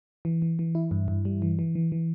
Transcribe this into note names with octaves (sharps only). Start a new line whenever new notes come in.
E3
E3
E3
E4
G2
G2
G3
E3
E3
E3
E3